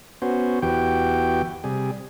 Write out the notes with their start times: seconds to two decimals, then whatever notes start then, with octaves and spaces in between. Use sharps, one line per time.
0.22 B3 C#4 F#4 C5
0.62 E2 E3 F#4 G4 G5
1.64 C3 G3 G#4